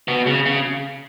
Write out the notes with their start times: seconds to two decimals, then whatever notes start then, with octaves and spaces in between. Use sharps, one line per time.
0.08 B2
0.26 C#3
0.45 C#3